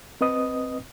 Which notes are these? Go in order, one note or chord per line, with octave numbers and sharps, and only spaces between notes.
C4 B4 D#5 D#6